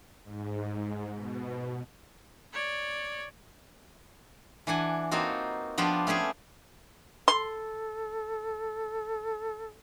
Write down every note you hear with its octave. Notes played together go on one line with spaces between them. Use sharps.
G#2
B2
C#5 D5
E3 D4 F#5 G#5
A#3 C4 D#4 F4 F#4
F3 B3 D4 F4 G4
A3 C#4 G4 G#4
A4 C6